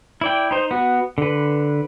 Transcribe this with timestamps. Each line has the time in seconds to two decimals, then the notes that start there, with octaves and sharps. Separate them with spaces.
0.21 E4 D5 G5
0.51 D#4 C5
0.71 B3 F#4
1.18 D3 B4